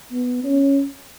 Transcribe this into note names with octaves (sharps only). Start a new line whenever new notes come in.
B3
C#4